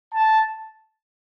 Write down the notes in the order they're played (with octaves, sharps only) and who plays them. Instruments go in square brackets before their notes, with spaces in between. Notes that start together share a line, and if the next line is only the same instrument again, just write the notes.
[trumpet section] A5